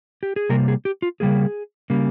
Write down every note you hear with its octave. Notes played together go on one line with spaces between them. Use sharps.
G4
G#4
C3 G3 A#3 A#4
G#4
G4
F4
C#3 G3 A#3 G#4
C#3 G3 A#3